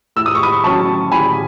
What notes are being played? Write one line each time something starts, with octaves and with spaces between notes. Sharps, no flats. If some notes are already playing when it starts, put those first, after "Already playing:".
A2 E6
D#6
C#6
B5 D#6
F#3 C#4 A5 C#6
A2 G#5 B5